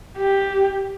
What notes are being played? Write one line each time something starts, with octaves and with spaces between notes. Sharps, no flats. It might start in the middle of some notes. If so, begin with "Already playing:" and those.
G4